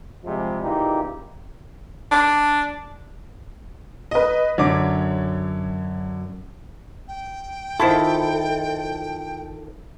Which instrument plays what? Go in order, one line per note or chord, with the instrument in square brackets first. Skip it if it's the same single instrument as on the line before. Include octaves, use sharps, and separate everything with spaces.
[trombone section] C3 F3 G3 G#3
A#2 C#3 E3 D#4 G4
[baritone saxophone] D4
[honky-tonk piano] B4 D#5
[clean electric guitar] F#2 [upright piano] D3 D6 [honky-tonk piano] C#5
[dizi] G5
[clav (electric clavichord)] D#3 E4 [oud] F4 G#4 C5 [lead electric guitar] A4